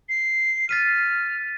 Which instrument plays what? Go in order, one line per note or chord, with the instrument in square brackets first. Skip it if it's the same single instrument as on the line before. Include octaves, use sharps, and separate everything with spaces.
[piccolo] C7
[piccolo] F6 [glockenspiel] A6 B6 D#7